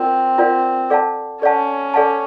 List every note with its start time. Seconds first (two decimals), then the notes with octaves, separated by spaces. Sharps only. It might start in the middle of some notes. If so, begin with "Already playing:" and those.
Already playing: C4 F4 A#4 D5 F#5
0.38 F4 A#4 D5 F#5
0.90 A4 D5 F#5 A5
1.42 C#4 A4 D5 F#5 A5
1.94 A4 D5 F#5 A5